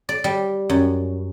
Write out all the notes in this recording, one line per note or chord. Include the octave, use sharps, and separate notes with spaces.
D5
G3
F#2